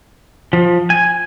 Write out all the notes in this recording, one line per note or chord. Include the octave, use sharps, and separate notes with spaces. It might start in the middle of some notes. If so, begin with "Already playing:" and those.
F3
G#5